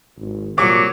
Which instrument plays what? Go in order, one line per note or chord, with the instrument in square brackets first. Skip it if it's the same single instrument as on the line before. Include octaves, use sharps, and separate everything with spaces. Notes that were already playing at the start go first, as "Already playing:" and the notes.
[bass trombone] G#1
[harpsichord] C2 C#6 [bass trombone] A#2 [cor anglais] F#3 [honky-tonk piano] D6